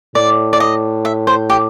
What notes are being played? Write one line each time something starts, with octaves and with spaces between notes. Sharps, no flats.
A2 D5
D5
D#5
E5
C5
G4